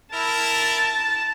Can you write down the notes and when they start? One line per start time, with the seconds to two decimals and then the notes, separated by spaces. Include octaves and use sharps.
0.14 E4 A#4 A5